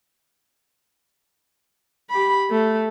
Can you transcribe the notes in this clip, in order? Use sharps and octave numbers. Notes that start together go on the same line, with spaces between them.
G4 B5
A3